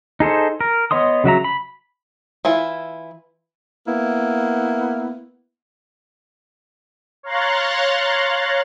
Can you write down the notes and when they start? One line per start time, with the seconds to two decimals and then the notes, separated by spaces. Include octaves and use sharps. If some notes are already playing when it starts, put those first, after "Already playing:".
0.20 D#4 G#4 A4 C5
0.61 A#4
0.91 B3 C#5 D#5 C6 D#6
1.24 C#3 F#3 E5 A#5
1.44 B5
2.45 E3 E4 F4
3.87 A#3 B3 E4
7.23 C#5 F5 A#5 C6 F#6 A6